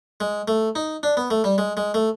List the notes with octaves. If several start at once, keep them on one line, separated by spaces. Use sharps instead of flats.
G#3
A3
D#4
D4
B3
A3
G3
G#3
G#3
A3